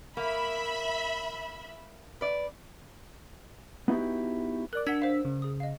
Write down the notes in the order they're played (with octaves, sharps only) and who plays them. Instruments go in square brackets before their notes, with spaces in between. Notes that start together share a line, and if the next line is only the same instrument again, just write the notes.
[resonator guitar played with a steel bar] A#3 [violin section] E5 B5
[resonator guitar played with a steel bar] B4 D5
[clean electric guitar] B3 D#4 E4 F#4 G4
[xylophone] A#4 D5 [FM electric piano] D6 F#6
[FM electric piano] D4 E6 B6 [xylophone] F#5 G#6
[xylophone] C5 F5
[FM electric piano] C#3
[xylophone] G#4 D#6
D#5 F5